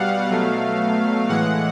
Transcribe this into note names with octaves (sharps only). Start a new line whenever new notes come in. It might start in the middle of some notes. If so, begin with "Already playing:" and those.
Already playing: B2 G3 F5 F#5
B2 F#3 A3
A2 E3 G#3 F#5